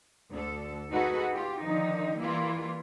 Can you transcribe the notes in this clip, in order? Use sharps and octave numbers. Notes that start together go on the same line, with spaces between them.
D2 A4
D#4 F#4 G#4 A4 B4
F4 G4
D3 D#3 F3 D#4
E3 G3 A#3 E4 F4